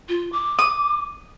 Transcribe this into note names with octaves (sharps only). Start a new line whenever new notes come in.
F4
D6
D#6